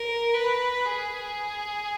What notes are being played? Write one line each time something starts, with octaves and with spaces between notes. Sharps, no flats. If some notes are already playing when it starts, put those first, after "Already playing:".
Already playing: A#4
B4
G#4